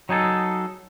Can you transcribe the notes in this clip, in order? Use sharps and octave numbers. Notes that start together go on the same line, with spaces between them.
F#3 D#4 G#4 A4